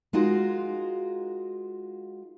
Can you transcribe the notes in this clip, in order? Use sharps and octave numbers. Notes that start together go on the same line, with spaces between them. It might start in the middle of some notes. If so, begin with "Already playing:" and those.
G#3 D#4 F4 F#4 A#4